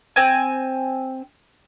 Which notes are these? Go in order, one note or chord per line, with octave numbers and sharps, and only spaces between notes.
C4 G#5